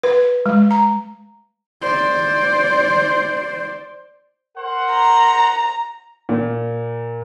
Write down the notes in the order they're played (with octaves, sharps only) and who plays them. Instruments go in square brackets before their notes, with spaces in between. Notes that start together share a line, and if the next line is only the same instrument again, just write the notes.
[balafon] B4
G#3
A#5
[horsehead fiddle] C5 D5
[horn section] A#4 C5 F#5
[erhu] A#5
[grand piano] A#2